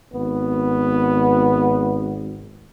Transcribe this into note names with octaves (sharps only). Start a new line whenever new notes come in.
G#1 B3